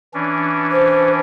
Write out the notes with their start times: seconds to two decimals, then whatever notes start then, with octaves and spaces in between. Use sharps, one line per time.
0.14 E3 C#4 D4
0.72 C5